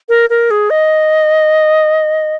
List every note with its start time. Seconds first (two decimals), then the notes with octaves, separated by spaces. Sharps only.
0.09 A#4
0.30 A#4
0.51 G#4
0.70 D#5